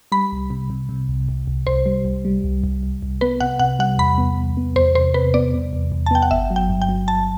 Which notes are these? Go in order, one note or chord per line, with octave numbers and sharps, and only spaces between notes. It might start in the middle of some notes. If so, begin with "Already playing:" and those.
G3 B5
C2
C3
C3
C3
C2
C2
C2
C2 C5
G3
C2
G3
C2
C2
C2
C2
B3 B4
C3 F#5
C3 F#5
G3 F#5
E2 B5
B3
E2
B3
E2 C5
C3 C5
C3 B4
B3 D5
C3
E2
E2
A5
B3 G5
F#5
G1 E5
F#3
G5
G2
G5
F#3
G1 A5